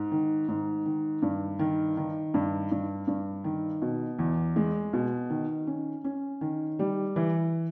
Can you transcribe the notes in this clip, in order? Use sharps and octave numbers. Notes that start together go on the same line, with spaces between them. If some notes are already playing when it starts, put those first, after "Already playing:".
Already playing: G#2
D#3
G#2
D#3
G2
D#3
D#3
G2
G2
G2
D#3
B2
E2
G#3
B2
D#3
C#4
C#4
D#3
G3
E3